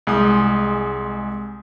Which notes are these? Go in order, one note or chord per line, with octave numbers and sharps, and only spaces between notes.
C2 G#3 D#6